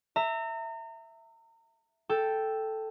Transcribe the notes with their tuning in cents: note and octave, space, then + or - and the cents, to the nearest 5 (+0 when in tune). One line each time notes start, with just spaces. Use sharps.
E5 +0 A#5 -35
A4 +0 G5 +0